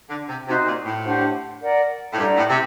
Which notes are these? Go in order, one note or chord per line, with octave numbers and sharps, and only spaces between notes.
D3
C3
C3 D#4 F#4 C5
A#2
A2
D4 G4 C5 F#5
A#4 D5 F#5
A2
G2 A4 D5 F#5 A#5
A2
C3